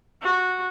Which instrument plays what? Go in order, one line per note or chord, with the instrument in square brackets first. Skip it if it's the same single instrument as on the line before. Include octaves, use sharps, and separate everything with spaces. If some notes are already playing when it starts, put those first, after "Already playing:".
[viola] F#4